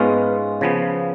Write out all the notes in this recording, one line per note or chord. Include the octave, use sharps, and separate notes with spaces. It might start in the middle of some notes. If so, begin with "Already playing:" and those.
Already playing: G#2 G#3 B3 C#4 F4
C#3 F3 B3